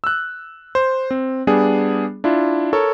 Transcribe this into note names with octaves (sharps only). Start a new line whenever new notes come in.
E6 F#6
C5
C4
G3 B3 D4 G#4
D4 E4 F4
A4 A#4 C#5